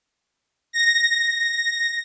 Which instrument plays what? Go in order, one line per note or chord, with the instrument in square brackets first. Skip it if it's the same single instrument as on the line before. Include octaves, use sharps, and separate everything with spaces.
[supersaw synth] A#6